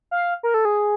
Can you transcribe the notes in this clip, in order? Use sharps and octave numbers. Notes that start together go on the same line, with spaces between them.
F5
A#4
A4
G#4